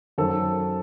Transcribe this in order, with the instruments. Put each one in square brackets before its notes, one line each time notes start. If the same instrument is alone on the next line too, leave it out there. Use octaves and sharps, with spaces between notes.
[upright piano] F#2 D#3 F#3 A4 C5